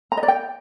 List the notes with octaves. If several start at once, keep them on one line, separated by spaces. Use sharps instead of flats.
A#5
D#5
D5
G5